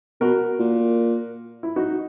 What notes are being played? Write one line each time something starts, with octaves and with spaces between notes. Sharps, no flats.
B2 F#4 A#4
A#2
E4
D#4 F#4